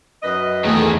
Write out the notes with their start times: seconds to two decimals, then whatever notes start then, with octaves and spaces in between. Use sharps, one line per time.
0.23 F#2 B4 D#5
0.65 E2 D#3 A3 G#4